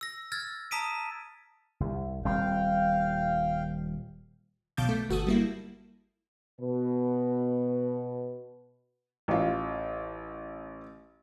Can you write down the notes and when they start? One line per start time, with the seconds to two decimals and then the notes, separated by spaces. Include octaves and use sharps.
0.01 E6 A#6
0.32 E6 F6 G#6 A6
0.71 A5 A#5 D#6 B6 D7 D#7
1.80 C2
2.25 D#1 G3 C4 F5 G5
4.77 B1 B2 F5 A5 D6 G6
4.89 A3
5.09 G1 F#4 A4 D#6
5.27 G3 A#3 E4
6.60 B2 B4
9.28 A1 F4